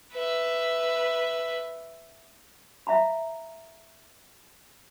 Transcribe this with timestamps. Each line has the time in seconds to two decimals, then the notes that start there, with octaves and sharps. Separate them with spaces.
0.13 B4 E5
2.87 E5 F5 A#5 B5